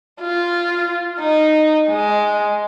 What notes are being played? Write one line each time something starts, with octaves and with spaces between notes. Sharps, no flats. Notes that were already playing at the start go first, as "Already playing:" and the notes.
F4
D#4
G#3